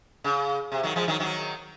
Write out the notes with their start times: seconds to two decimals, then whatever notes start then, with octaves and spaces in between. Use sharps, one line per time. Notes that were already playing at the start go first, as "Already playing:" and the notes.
0.24 C#3
0.72 C3
0.83 D#3 F#3
0.96 F3 G#3
1.08 D#3 F#3
1.20 D#3 F#3